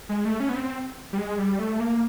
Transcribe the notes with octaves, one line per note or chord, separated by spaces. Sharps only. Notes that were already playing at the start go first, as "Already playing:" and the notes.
G#3
A3
C#4
B3
C4
G3
G#3
G3
A3
A#3